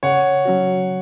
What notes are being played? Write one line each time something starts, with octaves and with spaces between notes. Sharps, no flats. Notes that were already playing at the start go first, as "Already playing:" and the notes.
C#3 C#5 F#5
F#3 C#4 F#4